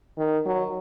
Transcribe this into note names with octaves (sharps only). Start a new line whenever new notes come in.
D#3
F#3